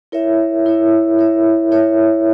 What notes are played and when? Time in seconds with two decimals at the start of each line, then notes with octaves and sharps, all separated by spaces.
0.12 E4 A#4 C#5 E5
0.66 E4 A#4 C#5 E5
1.19 E4 A#4 C#5 E5
1.72 E4 A#4 C#5 E5